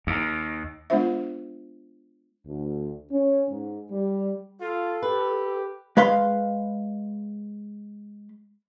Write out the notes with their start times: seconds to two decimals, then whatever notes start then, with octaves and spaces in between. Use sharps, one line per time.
0.07 D#2
0.90 G#3 B3 D4 F4 C5 E5
2.46 D2
3.11 C#4
3.50 G#2
3.91 G3
4.61 F4 A4
5.03 G4 B4
5.97 G#3 B4 F5 C6